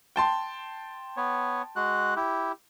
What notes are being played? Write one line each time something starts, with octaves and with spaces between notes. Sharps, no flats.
G5 A5 C6
B3 C#5
G#3 F#4 F#6
E4 G4